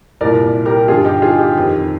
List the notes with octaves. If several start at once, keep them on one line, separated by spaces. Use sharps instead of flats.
C2 A#2 A#4 D5
G4 A#4
G2 D3 F4 G#4
D#4 G4
F4 G#4
D#4 G4
F2 D#3